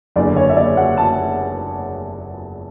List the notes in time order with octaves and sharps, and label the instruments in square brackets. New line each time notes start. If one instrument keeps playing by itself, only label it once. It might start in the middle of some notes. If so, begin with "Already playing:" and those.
[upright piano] F#1 E2 D3 D5
C#5
E5
D5
F#5
A5